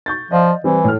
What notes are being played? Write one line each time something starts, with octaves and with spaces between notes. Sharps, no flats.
C#6 G6 A6
F3 D5 D#5 F5
E3 G3 C4
A2 A4 F6